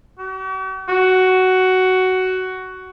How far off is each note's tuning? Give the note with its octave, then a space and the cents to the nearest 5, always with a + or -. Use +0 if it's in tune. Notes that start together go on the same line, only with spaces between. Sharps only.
F#4 +45
F#4 +10